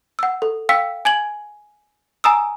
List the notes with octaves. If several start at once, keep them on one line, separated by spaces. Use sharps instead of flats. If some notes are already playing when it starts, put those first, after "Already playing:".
F#5 E6
A4
F5 G5 E6 B6
G#5 G#6 F#7
G#5 A#5 D#6 E6